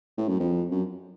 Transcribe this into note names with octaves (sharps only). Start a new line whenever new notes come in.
A2
F#2
F2
F#2